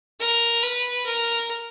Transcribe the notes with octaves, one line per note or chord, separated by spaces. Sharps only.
A#4
B4
A#4